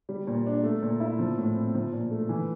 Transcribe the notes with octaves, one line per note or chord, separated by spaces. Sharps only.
G3
A#2
D4
A3
A#2
E4
F3
A2
C4
F3
A#2
A3
E3